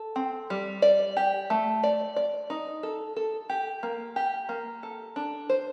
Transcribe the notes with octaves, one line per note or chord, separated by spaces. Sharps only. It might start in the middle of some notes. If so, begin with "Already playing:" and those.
Already playing: A4
C4
G3
D5
G4
A3
D5
D5
D#4
A4
A4
G4
A#3
G4
A#3
A4
D4
C5